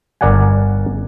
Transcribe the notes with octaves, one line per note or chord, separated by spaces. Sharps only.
G1 A#4 D5 F#5 G#5